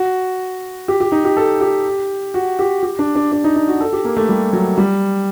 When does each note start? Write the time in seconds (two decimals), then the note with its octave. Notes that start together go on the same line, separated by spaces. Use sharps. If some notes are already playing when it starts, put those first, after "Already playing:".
Already playing: F#4
0.88 G4
1.00 G4
1.12 D#4
1.25 G4
1.37 A4
1.61 G4
2.34 F#4
2.59 G4
2.83 G4
2.99 D4
3.15 D4
3.32 D4
3.44 D#4
3.56 D#4
3.68 F#4
3.81 A4
3.93 G4
4.05 A#3
4.17 A3
4.29 G3
4.53 F#3
4.78 G3